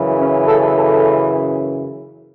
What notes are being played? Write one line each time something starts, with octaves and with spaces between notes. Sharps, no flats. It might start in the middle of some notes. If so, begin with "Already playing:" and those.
Already playing: F#2 C#3 E3
C#4
A4
A4